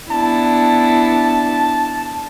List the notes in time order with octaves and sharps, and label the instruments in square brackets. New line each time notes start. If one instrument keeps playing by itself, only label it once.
[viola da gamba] B3 D4 E4 [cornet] A5